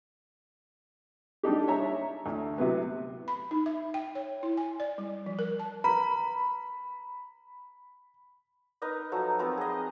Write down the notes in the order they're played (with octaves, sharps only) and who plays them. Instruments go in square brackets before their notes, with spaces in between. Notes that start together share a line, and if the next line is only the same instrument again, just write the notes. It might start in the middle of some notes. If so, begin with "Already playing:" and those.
[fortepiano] G3 D4 D#4 G4
C#5 E5 A#5
D2
C3 F#3 B3
[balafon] B5
D#4
E5
G5
C#5
E4
G#5
D5
G3
F3
A#4
A5
[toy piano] B4 A#5 [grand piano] B5
[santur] D#4 A#4 B4 D#5
F3 F#3 A4
F3 B3 C4 A#4
G#4 D#5